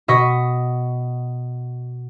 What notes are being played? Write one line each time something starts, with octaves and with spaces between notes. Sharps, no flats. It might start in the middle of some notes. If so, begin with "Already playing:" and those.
B2 D#5 C#6 B6